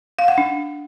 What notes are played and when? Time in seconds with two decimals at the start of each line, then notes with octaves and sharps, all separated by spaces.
0.19 F5
0.28 F#5
0.38 D4